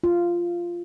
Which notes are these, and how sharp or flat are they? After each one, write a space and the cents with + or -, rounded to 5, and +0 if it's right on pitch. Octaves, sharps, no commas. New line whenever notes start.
F4 -10